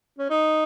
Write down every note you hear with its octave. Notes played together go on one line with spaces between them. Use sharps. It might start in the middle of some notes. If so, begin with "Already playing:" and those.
C#4
D#4